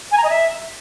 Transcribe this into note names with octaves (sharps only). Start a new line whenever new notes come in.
G#5
A#5
D#5
E5